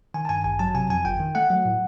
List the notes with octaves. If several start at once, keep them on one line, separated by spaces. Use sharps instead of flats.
D#3 G#5
A5
G2 G#5
A1 G#5
F#3 A5
C3 G#5
F2 G#5
G1 G5
D#3
A3 F#5
F#3
A2